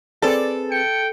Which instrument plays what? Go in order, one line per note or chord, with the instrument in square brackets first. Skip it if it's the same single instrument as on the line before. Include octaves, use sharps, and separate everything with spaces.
[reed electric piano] C4 G#4 B4 [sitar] A4 [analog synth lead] D5
[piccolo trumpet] G5 [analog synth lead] C#7